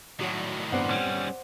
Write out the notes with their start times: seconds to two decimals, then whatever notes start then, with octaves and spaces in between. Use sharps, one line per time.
0.19 A2 D#3 F#3 F#4 D5
0.72 G2 B3 C4 C5 D5 F#5
0.91 G3 C#4